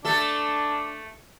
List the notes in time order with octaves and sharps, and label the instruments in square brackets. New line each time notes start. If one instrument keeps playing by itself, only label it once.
[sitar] A3 A4 [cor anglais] D4